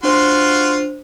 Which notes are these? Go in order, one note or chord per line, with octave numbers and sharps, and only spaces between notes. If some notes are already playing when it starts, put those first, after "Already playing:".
D4 F4 F#4 C5 C6